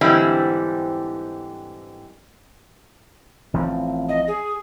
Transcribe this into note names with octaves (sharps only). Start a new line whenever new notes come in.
G#2 D3 E3 G3 C4 E4
A1 F3 C4
D#5
G#4